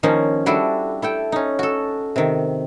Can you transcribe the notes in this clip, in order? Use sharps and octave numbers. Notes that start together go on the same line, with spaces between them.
D#3 F3 A#3 C#4 D#4
G3 D4 E4 F#4 A4
E4 A4 G5
C#4 D#4
F#4 A4
C3 D#3